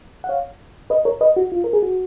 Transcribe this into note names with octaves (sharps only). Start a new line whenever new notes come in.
F#5
C#5 F5
B4 D#5
A#4 C#5
B4 D#5
F#4
F4
A#4
G#4
F#4